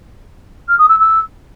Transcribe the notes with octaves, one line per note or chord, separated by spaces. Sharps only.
F6
D#6
E6
E6